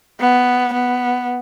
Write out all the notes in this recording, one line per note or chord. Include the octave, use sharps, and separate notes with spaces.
B3
B3